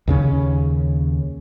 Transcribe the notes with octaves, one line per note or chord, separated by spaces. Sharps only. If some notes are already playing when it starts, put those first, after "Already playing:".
D#2 C#3 C#4